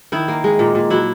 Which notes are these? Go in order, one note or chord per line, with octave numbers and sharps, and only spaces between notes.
D#3 E4
A#3
G#3
A#2
A#2
F#3 E4